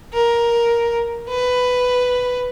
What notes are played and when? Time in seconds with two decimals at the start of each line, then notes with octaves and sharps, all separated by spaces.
0.13 A#4
1.29 B4